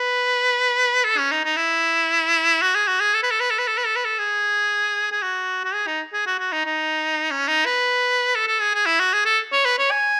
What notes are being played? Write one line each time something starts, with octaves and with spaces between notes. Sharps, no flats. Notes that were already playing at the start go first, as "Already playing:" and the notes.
Already playing: B4
A4
C#4
D#4
D#4
E4
F#4
G#4
F#4
G#4
A4
B4
A4
B4
A4
B4
A4
B4
A4
B4
A4
G#4
G#4
F#4
F#4
G#4
D#4
G#4
F#4
F#4
D#4
D#4
C#4
D#4
B4
A4
A4
G#4
G#4
E4
F#4
G#4
A4
C#5
B4
C#5
G#5